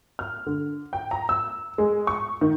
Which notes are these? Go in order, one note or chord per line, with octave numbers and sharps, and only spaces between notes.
F6
D3
G5
A#5
E6
G#3
C#6
D#3